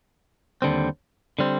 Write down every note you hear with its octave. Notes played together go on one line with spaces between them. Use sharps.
D#2 D3 G3 C4
D3 G3 C4